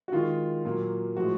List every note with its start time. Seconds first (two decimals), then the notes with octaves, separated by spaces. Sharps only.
0.08 F#4
0.12 D#3 G#3 F4
0.65 A#2 F#3 A#3
1.16 A2 F3 G#3 F#4